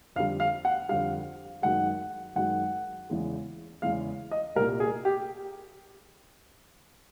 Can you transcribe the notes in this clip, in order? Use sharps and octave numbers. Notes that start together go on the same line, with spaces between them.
F2 D3 G3 F5
F5
F#5
F2 D3 G3 F5
F#2 D#3 G#3 F#5
F#2 D#3 G#3 F#5
E2 C#3 E3 G#3
E2 C#3 E3 G#3 F5
D#5
C2 A#2 G3 A#4
G#4
G4